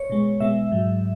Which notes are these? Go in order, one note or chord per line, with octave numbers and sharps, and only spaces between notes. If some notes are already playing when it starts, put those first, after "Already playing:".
Already playing: C#5
B2 G#3
B2 G#3 E5
G#2 F#3